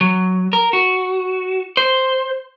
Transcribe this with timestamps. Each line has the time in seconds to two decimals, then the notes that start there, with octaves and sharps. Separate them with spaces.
0.01 F#3
0.53 A#4
0.73 F#4
1.77 C5